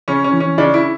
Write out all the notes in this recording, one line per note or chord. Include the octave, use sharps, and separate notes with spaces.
C#3 C#4
C#4
E3
C#4
C#3 D4
E4